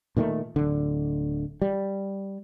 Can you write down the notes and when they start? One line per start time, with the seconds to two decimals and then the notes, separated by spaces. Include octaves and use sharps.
0.17 A#2 D#3 G3 A3
0.56 D1 D3
1.62 G3